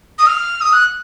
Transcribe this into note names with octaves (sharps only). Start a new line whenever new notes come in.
D#6
F6
D#6
F#6